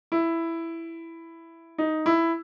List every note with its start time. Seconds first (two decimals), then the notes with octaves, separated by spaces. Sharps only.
0.12 E4
1.78 D#4
2.06 E4